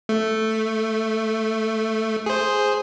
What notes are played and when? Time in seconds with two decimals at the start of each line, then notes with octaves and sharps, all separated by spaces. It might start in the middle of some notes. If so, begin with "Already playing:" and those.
0.09 A3
2.26 G#4 C5